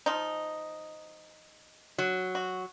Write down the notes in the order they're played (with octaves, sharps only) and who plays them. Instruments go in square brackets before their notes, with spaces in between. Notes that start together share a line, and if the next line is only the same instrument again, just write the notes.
[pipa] F3 D#4
[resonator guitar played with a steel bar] F#3
[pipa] F#4